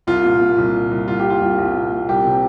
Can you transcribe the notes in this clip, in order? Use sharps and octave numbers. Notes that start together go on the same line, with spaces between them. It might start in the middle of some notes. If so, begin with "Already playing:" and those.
C2 F4
A#2
A#2
C2
A#2
C2
C2 F4
A#2 G4
F4
C2
C2
A#2
A#2
C2 G4
C3